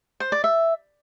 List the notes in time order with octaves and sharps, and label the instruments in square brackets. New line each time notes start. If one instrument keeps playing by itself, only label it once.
[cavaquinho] C5
D5
E5